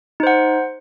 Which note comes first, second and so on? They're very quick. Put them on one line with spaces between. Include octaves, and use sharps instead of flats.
D#4 C5 F#5